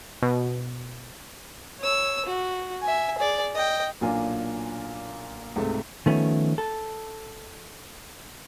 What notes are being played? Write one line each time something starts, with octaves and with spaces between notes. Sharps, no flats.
B2
C#5 E6
F#4
E5 G#5
G#4 D5
D#5 G5
B1 A#2 A#3 D4 F4 G#5
C#2 G#2 C3 A3
D#3 F3 A3 B3 C#4
A4